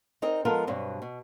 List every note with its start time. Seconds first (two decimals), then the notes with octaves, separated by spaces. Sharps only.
0.22 C4 D#4 G#4 A#4 D#5
0.45 F3 G#3 B3 F4 A4 A#4
0.67 G2 B2 F#3 B3 C4
1.02 B2